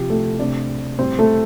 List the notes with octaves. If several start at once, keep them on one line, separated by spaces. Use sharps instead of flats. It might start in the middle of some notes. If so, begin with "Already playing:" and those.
Already playing: C3 F3 C4 G4
A3 A4
C3 A3 C4 D4 D5
A2 G3 C4 C5
A3 A4